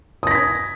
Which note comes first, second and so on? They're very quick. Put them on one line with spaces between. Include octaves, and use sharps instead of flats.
D#6 A#6 B6 G#6